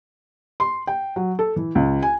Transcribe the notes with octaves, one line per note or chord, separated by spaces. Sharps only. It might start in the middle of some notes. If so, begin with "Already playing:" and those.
C6
G5
F#3
A4
E3
C#2
G#5